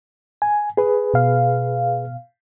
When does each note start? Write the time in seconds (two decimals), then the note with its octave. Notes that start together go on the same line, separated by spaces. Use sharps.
0.42 G#5
0.77 G#4 B4
1.14 B2 F5